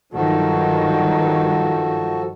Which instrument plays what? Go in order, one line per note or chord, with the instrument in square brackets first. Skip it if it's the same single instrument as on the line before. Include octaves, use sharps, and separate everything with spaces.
[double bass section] G2 D#3 F#3 [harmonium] F3 F#4 A4